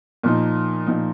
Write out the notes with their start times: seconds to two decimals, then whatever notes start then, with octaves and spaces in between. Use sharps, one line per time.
0.23 A#2 F3 D#4
0.87 A#2 F3 D#4